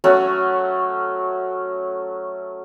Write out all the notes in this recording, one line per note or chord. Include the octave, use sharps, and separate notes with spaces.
F#3 A3 C#4 F#4